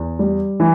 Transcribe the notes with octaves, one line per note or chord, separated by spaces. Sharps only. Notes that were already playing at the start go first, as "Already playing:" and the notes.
Already playing: E2
G3
E3